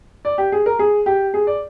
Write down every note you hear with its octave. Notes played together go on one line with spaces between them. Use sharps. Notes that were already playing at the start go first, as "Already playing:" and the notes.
D5
G4
G#4
A#4
G#4
G4
G#4
D5